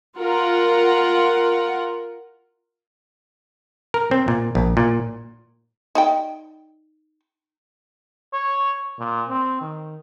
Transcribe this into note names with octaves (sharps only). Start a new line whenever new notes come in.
F4 A#4 F#5
A#4
C4
A#2
A#1
A#2
D#4 D5 G5
C#5
A#2
C4
D#3